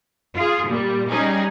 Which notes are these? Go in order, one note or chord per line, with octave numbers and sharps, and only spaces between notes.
F4 G#4
A#2 G3
G3 C#4 D#4 G#4